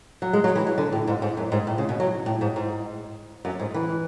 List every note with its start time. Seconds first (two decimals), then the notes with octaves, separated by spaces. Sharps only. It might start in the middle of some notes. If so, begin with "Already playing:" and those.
0.22 F#3
0.33 G#3
0.44 F#3
0.56 E3
0.67 F#3
0.78 D3
0.92 A2
1.07 G#2
1.22 G#2
1.37 F#2
1.52 G#2
1.67 A2
1.78 C#3
1.89 B2
2.00 F#3
2.26 A2
2.41 G#2
2.56 G#2
3.45 F#2
3.60 G#2
3.74 E3